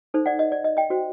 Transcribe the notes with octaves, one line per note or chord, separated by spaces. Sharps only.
D#4 A4 C5
D5 F#5
D#5
D5
D#5
D#5 G5
F#4 C5